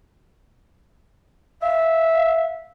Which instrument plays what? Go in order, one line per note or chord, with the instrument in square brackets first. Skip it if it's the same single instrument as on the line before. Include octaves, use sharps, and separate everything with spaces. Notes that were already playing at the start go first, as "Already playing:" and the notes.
[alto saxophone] E5 [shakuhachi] F5